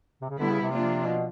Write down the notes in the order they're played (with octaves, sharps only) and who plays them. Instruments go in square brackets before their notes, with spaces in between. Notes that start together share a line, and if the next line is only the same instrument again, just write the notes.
[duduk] C3
C#3
[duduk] D3 [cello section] G3 B3 E4
[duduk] C#3
C3
[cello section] F3 A#3 D4 F4
[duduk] B2